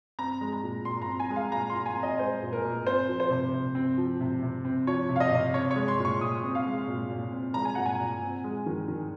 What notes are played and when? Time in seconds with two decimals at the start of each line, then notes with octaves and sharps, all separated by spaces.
0.19 C4 A#5
0.41 G#3
0.53 A#5
0.63 A#2
0.85 A#2 C6
1.02 A#5
1.07 C4
1.20 G#5
1.30 G#3
1.36 F5
1.52 A#2 A#5
1.70 C6
1.75 A#2
1.86 G#5
1.96 C4
2.03 D#5
2.19 G#3 C5
2.42 A#2
2.53 A#4
2.64 A#2
2.86 C4 C5
3.08 F3
3.20 C5
3.31 C3
3.54 C3
3.75 C4
3.97 F3
4.21 C3
4.43 C3
4.65 C4
4.87 F3 C#5
5.09 C3
5.16 F5
5.20 D#5
5.32 C3
5.54 C4 C#5
5.71 C#5
5.76 G#3
5.88 C6
5.99 A#2
6.05 C#6
6.21 A#2 D#6
6.43 C4
6.55 F5
6.66 G#3
6.88 A#2
7.10 A#2
7.32 C4
7.54 G#3 A#5
7.65 G#5
7.75 A#2 F#5
7.85 G#5
8.00 A#2
8.22 C4
8.44 G#3
8.66 D#3
8.88 D#3